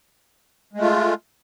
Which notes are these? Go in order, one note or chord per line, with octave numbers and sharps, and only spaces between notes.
G#3 A3 F4